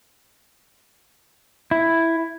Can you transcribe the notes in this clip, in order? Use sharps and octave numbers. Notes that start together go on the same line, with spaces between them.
E4